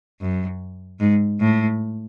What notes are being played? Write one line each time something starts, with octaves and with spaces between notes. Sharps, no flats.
F#2
G#2
A2